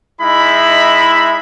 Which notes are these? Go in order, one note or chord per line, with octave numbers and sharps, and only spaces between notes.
G#3 D#4 E4 E5 B5